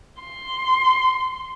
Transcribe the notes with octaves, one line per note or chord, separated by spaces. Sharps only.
C6